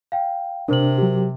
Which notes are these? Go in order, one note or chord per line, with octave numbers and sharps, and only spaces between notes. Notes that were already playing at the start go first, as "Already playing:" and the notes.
F5 G5
C3 D4 A#4 C5 F#7
F#3 G4